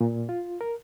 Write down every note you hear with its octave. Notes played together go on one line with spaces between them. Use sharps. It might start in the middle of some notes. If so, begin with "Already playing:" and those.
A#2
F4
A#4